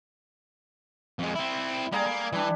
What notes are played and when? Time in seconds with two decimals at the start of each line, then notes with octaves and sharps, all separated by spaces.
1.19 F2 G#3
1.35 C4 E4
1.92 G3 A#3 G#4 A#4 G#5
2.06 A#3
2.33 E3 G3 D4